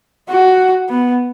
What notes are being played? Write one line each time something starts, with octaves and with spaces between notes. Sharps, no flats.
F#4
B3